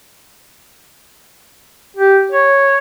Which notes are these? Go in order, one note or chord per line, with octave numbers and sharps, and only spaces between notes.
G4
C#5